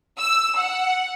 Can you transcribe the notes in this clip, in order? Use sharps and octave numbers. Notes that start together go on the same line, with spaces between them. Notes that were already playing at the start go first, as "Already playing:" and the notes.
E6
F#5